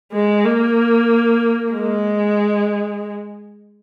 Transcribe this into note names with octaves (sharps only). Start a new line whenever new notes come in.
G#3
A#3
G#3